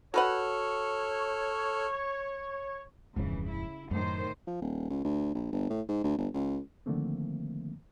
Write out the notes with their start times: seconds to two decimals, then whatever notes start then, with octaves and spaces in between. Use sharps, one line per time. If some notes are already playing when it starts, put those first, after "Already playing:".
0.14 F#4 A4 B4 C#5 F#5 F6
3.16 D1 F2 G#2 C#3 E3
3.49 E4
3.91 F#2 A2 D#3 C5
4.47 F3
4.62 D#1
4.90 C#2
5.04 D2
5.35 A#1
5.52 G1
5.70 A2
5.88 G#2
6.04 D2
6.18 G1
6.34 C#2
6.86 D3 D#3 F3 A3 A#3 C4